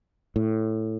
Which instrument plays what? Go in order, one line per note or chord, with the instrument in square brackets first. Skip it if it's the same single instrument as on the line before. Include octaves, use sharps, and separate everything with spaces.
[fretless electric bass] A2